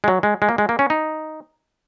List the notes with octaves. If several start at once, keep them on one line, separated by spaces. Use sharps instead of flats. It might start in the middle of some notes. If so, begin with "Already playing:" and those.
G#3
F#3
G#3
G#3
A#3
G#3
A#3
C#4
D#4